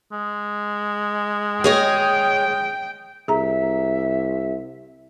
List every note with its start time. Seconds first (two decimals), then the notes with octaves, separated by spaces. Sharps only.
0.12 G#3
1.64 G#4 C#5 D#5 G5
3.28 C2 G#4 E5 A#5